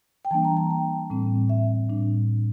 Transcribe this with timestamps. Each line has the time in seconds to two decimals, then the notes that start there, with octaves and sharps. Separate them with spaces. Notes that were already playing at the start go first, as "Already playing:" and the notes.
0.25 G5
0.31 E3 G3 A#3 D4 A5
0.45 A#5
0.57 A5
0.70 G5
1.10 A2 G3 C4
1.49 E5
1.90 A2 G3 D4